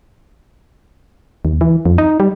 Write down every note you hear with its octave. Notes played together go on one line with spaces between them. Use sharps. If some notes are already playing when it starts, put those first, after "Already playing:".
D#2
E3
F2
D#4
G3